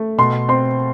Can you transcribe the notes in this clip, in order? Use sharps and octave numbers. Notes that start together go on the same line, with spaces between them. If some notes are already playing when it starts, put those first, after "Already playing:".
Already playing: A3
B2 C6
C4 C6